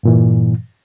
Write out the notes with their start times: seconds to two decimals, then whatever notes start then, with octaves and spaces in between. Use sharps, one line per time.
0.03 G2 A#2 E3